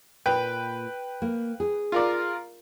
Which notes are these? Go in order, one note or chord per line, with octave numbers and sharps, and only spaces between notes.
A#2 B4 G5
A#3
G#4
F4 A#4 D5